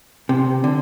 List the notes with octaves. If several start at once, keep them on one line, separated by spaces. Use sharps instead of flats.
C3
D3